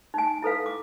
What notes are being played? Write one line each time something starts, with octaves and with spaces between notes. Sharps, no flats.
D#4 G#5
E4 A4 B4 F5
D6